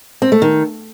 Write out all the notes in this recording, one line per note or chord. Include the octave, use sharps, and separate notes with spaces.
C4
A3
D#3